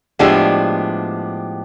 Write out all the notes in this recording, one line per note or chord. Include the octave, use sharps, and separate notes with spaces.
A2 F3 G#3 B3 D4 G4